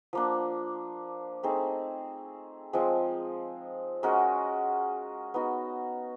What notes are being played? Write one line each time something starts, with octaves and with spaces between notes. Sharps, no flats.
F3 A#3 D4
A3 C4 D#4 G#4
F3 G#3 C4
G#3 C#4 F#4 A#4
B3 D#4 F#4